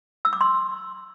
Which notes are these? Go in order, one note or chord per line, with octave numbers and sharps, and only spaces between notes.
E6
D6
C6